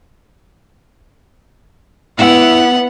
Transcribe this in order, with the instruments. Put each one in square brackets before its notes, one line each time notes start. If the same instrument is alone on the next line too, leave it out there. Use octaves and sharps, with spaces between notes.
[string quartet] B3 [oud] E4 E5 [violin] F#5